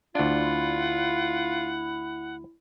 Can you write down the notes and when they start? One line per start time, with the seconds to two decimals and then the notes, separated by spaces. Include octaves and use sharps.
0.15 D2 D4 E4 F4 F#5